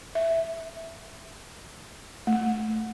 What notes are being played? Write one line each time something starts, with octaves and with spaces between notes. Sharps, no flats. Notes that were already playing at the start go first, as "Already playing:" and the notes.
E5
A3